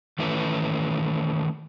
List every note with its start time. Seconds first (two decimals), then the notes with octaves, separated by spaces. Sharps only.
0.19 D#3 E3 A3 C#4 B4